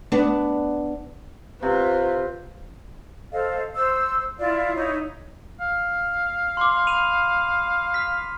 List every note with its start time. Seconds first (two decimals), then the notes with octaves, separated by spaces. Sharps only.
0.12 B3 D4
1.63 C3 F4 B4
3.32 A4 C5 D#5 F5
3.75 C5 E6
4.38 E4 F4 D5 F5
4.75 D#4 E4 C#5
5.60 F5
6.57 C6 D6
6.87 B5 D#7 F7
7.94 F6 B6